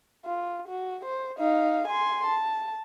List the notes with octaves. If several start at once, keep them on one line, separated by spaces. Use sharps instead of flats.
F4
F#4
C5
D#4 F5
G#5 C6
A5